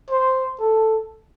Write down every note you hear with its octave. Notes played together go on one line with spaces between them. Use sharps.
C5
A4